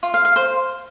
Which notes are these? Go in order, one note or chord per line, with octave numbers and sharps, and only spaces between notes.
F4
F5
F5
C5